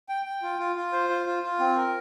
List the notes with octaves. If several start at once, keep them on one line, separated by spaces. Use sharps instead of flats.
G5
G5
F4
F4
F4
C5
F4
F4
F4
C4
A#4